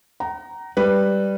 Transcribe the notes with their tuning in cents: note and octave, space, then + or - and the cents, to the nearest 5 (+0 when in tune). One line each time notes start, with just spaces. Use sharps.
F#5 +45 A#5 +0
G3 +0 B4 +0